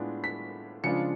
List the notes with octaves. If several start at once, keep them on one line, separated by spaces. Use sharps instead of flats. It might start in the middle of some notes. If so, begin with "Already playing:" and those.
Already playing: A2 G#3 B3 D4 F4
B6
C#3 F3 G#3 D4 F4 C#7